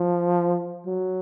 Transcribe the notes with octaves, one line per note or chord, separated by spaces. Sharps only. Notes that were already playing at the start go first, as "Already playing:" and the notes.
Already playing: F3
F#3